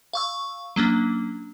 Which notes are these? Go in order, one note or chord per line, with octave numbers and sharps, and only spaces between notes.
F5 C#6 E6
F#3 A#3 C#4 D4